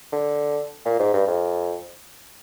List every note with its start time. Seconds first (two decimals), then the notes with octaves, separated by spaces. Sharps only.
0.12 D3
0.85 A#2
1.00 G#2
1.13 G2
1.27 F2